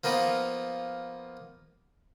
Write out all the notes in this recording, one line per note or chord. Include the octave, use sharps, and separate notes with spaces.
F3 A#3 B3 D#4 F4